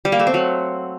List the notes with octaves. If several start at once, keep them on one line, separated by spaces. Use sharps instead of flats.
G3
A#3
A3
C4
F#3